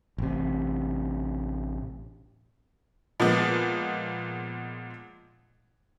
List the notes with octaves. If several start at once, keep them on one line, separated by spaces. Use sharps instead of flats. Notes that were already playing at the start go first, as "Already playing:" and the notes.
A1 C3
A#2 F3 G#3 B3